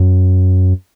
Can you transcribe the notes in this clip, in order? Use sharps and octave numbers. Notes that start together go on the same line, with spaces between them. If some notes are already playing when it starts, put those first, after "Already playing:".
Already playing: F#2